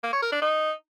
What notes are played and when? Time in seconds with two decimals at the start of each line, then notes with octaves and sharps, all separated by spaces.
0.03 A#3
0.13 C#5
0.22 A#4
0.32 D4
0.42 D#4